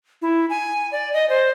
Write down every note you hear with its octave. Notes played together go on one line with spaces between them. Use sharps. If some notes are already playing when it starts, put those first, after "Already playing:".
E4
G#5
D5
D#5
C5